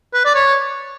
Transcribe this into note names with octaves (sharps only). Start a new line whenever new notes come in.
B4
D5
C#5